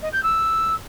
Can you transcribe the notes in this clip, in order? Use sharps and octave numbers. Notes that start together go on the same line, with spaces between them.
D#5
G6
E6